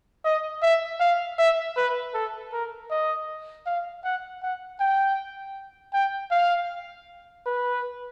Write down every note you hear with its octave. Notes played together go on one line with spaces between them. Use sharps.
D#5
E5
F5
E5
B4
A4
A#4
D#5
F5
F#5
F#5
G5
G5
F5
B4